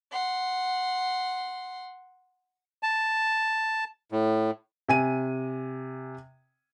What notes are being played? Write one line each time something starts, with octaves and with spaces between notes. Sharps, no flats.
F#5 C6
A5
A2
C3 G#5 D#7